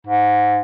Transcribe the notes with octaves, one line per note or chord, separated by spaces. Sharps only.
G#2